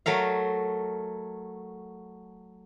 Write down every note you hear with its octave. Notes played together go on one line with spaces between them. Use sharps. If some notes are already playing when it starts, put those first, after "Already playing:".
F#3 A3 A#4 F5